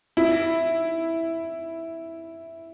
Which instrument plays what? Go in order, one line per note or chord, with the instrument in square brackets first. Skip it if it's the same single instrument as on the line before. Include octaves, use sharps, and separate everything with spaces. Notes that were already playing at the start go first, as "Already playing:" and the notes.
[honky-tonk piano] E4